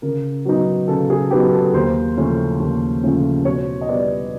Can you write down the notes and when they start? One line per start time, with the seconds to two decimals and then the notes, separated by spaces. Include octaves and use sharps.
0.02 C#3 A#4
0.45 F#3 B3 D#4
0.88 C#3 A4
1.10 G#4
1.31 F#3 B3 D#4 G4
1.53 A4
1.74 D#2 C5
2.17 C#3 F3 A3 C#4
2.60 D#2
3.04 C#3 F3 A3 C#4
3.45 B2 C#5
3.81 D#5
3.89 G3 B3 D5